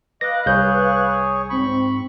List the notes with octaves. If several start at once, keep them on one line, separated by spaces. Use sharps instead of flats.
B4 D#5 F5 D6 F#6 A#6
C2 G#4 C#5 G6
G#2 C4 B5 C#6